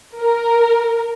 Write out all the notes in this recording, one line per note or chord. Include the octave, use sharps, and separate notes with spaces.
A#4